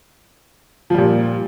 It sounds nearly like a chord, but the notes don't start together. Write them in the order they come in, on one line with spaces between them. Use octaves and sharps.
F3 G3 A#2